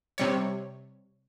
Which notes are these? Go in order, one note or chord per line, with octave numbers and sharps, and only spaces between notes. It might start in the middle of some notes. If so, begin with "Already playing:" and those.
C3 G3 C#5